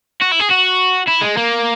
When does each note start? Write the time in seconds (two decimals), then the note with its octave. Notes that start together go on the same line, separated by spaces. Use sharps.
0.22 F#4
0.32 E4
0.40 G#4
0.51 F#4
1.08 E4
1.22 G#3
1.37 A#3